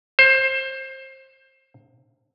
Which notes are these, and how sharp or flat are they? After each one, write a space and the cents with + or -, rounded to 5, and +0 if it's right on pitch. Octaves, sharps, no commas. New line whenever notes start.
C5 +20